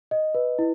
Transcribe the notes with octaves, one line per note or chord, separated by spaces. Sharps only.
D#5
B4
E4